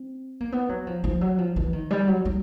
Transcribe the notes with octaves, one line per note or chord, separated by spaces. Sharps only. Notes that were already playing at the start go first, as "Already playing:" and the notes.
Already playing: C4
A#3
B3
F#3
F3
F3
F#3
F3
E3
D#3
G3
F#3
G3